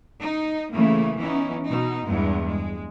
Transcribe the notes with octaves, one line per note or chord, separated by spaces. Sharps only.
D#4
C#3 E3 A3 A#3
E3 B3 C#4 D#4
B2 D#4
E2 G2 G#3
G#3